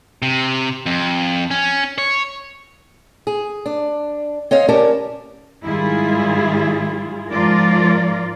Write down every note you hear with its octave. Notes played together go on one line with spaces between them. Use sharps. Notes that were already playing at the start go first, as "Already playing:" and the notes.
C3
F2
C#4
C#5
G#4
D4
C4 C#5 D#5 F5
C#4 G4 A#4 D5 A5
G#2 D#3 G3 E4 F4 G#4
G#2 F3 F4 A#4 D5